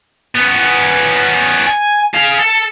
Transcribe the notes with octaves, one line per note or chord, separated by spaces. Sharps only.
B3 C#4
G#5
G#4 F5
A4